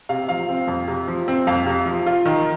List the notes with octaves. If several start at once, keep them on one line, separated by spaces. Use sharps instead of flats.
C3 F5
F3 F5
C4
F2
C3
F3
C4
F2 F5
C3
F3
F4
D#3